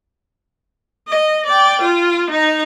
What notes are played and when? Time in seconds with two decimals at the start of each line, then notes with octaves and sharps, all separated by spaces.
1.08 D#5
1.46 D5 G5
1.81 F4
2.30 D#4 A#5